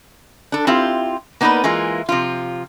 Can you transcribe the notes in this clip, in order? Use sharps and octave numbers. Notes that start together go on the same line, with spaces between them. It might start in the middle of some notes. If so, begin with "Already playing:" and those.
D4 A4
C4 E4 F4 G4
A#3 B3 D#4 A#4 B4 D5
E3 G#3 A#3 F4
C3 F3 F4